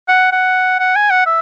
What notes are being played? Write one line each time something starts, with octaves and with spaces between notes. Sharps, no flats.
F#5
F#5
F#5
G#5
F#5
E5